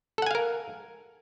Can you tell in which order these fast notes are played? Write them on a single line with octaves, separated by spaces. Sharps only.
A4 F#5 G#5 F5 A#4